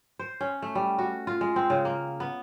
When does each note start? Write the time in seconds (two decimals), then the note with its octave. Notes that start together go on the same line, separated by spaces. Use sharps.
0.19 C5
0.41 C#4
0.62 A3
0.75 G3
0.99 F#4
1.27 F4
1.41 G#3
1.56 C4
1.70 C#3
1.85 A#3
2.20 B3